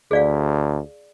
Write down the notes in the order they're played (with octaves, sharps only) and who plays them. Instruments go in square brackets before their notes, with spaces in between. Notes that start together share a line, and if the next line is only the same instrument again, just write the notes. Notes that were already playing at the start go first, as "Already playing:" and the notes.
[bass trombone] D2 [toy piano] G#4 D5 F5